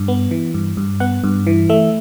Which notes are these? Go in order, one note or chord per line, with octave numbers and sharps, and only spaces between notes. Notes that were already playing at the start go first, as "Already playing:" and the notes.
Already playing: G2
B3
E3
G2
G2
B3 F#5
G2
E3
A3 E5